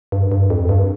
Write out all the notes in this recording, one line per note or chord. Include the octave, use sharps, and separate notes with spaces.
G2
G2
F2
G2